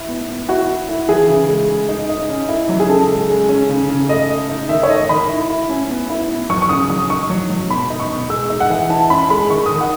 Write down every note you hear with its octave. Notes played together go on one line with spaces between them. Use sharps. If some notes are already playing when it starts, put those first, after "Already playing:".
Already playing: E4
B3
B3
E4 F#4
E4
E4
E3 G#4
C#3
G#3
G#3
D#4
D#4
C#4
E4
F#3
G#4
C#3 A4
G#3
G#3
C#4
C#3
C#3
A3 D#5
A3
D#4
D#3 E5
C#5
A3 D#5
D#3 B5
E4
E4
C#4
B3
E4
B3
F#3 C#6
C#6
C#3 D#6
F#3 D#6
D#4 C#6
F#3
F#3
B2 B5
D#4
C#6
B2
G#3 E6
D#4
F#5
E3
E4 A5
C#4 B5
G#3 B5
D#3 C#6
D#3 D#6
F#5